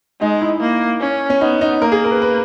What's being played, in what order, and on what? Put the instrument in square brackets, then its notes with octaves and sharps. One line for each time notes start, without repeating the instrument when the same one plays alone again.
[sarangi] G#3 [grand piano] D#4
[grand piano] E4
[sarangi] A#3
C#4
[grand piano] C#4
[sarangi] B3 [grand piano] D#4
[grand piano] D#4
[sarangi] A#3 [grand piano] A#4
[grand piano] G#4
A#4
B4
B4